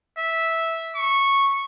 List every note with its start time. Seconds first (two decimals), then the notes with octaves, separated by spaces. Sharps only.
0.19 E5
0.96 C#6